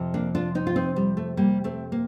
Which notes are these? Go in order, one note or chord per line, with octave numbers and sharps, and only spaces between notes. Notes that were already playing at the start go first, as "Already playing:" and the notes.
Already playing: F2 C3 F3
A#3 D4
D4 F4
C4 D#4
F4
C4 D#4
G3
A3
G3 A#3
A3 C4
A#3